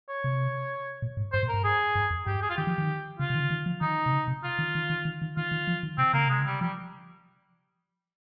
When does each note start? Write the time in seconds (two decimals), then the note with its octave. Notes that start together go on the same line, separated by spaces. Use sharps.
0.09 C#5
0.24 C3
1.02 A#2
1.17 G#2
1.33 G2 C5
1.43 A#2
1.49 G2 A#4
1.64 G#4
1.95 G2
2.11 F2
2.27 G2 G4
2.42 G#4
2.50 F4
2.57 D#3 G4
2.67 F3
2.78 D#3
3.19 C#3 F4
3.30 C3
3.35 D#3
3.40 C#3
3.51 D#3
3.66 F3
3.81 D#3 D#4
4.06 C3
4.12 C#3
4.28 C3
4.44 F4
4.59 D#3
4.75 D#3
4.90 D#3
5.05 D#3
5.22 D#3
5.37 D#3 F4
5.52 D#3
5.67 F3
5.83 D#3
5.98 C3 C4
6.14 C#3 A#3
6.26 C3 G#3
6.39 C#3
6.46 G3
6.61 F3 G3